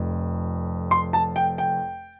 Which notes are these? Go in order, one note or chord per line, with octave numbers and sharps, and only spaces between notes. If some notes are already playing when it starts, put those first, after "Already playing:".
Already playing: F1 F2
C6
A5
G5
G5